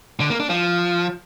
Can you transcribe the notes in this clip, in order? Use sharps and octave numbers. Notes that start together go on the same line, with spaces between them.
D3
A#3
D4
F3